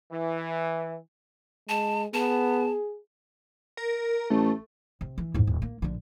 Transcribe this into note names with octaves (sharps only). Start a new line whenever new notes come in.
E3
G#3 A5
B3 G#4 A5
A#4
A1 A3
C3
E3
E2 G#2
D#1
A#3
A#1 D3